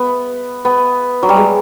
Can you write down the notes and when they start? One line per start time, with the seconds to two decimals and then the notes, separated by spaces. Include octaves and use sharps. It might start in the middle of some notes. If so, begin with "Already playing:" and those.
Already playing: B3
0.65 B3
1.23 F#3
1.29 G3
1.37 G#3